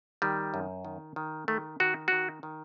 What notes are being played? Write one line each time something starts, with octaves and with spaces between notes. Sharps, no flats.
D#3 G3
F#2
D#3
D#3
D#3 A3
D#3 F#4
D#3 F#4
D#3